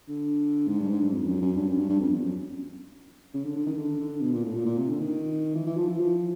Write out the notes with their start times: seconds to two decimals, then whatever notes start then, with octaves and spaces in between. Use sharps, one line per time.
0.08 D3
0.67 G#2
0.79 G2
0.90 G#2
1.01 G2
1.12 F2
1.26 F#2
1.42 F#2
1.56 G2
1.67 F#2
1.78 G2
1.89 G2
2.00 F2
2.12 E2
2.23 F#2
3.34 C#3
3.45 D3
3.56 D3
3.66 D#3
3.77 D3
4.00 D3
4.22 B2
4.33 A#2
4.45 A2
4.56 A#2
4.66 A#2
4.78 C3
4.89 D3
5.00 D#3
5.55 E3
5.66 E3
5.77 F3
5.88 E3
6.00 F3